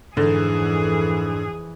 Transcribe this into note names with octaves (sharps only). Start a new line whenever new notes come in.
F2 G#2 D3 E3 G#4